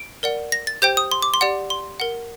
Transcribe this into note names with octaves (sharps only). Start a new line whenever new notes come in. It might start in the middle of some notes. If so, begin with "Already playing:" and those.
Already playing: D7
A#4 D5 F#5
A#6
A6
G4 C5 G5 G6
D#6
C6
D6
C6
G4 D5 F#5
C6
A#4 F#5